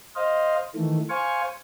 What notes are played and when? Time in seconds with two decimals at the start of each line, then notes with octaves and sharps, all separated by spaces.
0.16 C5 D#5 F5
0.75 D#3 E3 A3
1.09 C5 F5 G#5 C#6